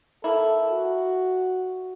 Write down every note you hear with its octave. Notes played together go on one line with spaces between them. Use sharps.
A#3 E4 A4
F#4